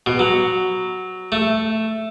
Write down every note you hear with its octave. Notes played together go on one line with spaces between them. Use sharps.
B2
F#3
A3